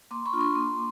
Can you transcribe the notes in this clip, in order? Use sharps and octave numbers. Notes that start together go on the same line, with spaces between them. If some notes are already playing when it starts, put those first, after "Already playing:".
A#3 C6 D6
B5 C#6
D4 F4
C6 D6
A#3